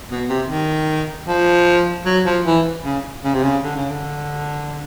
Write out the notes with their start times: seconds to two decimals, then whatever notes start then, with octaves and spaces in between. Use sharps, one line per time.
0.10 B2
0.29 C3
0.48 D#3
1.28 F3
2.05 F#3
2.25 F3
2.46 E3
2.84 C#3
3.24 C#3
3.34 C3
3.43 C#3
3.63 D3
3.76 C#3
3.90 D3